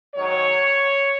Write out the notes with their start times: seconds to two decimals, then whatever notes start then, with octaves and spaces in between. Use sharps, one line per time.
0.15 G#2 D#3 F#3 C#5